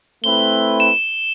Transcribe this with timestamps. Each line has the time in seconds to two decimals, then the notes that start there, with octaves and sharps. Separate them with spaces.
0.24 A3 C4 E4 B4 G7
0.80 E7